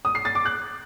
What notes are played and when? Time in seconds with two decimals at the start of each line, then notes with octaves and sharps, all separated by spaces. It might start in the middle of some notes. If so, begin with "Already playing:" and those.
0.05 D#6
0.15 C7
0.25 A6
0.35 D6
0.46 F#6